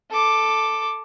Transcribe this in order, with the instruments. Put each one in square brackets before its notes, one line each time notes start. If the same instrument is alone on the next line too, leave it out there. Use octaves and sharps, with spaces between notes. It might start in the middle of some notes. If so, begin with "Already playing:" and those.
[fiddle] A4 D6